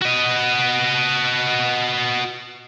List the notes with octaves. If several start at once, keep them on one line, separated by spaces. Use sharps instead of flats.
F#4 D#5